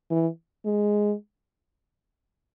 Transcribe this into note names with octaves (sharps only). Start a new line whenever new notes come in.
E3
G#3